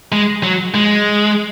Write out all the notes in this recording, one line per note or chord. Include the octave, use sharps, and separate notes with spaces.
G#3
F#3
G#3